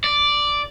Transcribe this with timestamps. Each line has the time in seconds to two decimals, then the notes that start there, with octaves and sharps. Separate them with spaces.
0.04 D5